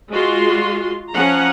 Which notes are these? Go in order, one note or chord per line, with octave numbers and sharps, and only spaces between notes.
G#3 F4 F#4 C6
F3 C#4 F#5 A#5